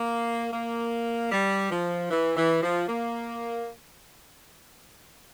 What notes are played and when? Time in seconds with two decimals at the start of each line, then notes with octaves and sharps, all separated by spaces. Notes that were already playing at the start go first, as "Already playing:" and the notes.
Already playing: A#3
0.52 A#3
1.32 G3
1.70 F3
2.10 E3
2.36 E3
2.63 F3
2.88 A#3